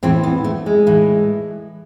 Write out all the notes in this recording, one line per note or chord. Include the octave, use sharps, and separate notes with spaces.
A2 E3 C4
B3
A3
G#3
A2 E3